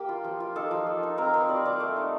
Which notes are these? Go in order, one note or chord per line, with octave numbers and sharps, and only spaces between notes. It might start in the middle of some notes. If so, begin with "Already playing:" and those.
Already playing: A#3 G4 G5
F4
F3
F4
D#4 A4 A5
F3
A#3
D#4
C4 A#4 A#5
C4 C5 C6
G3 D5 D6
A#3 D5 D6
A3
D#4